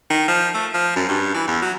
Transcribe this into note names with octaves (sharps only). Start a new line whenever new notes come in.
D#3
F3
A3
F3
F#2
G2
E3
E2
F#3